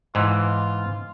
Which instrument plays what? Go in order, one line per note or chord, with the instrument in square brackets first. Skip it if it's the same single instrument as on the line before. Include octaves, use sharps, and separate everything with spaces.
[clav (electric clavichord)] G#2 E3 [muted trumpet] F4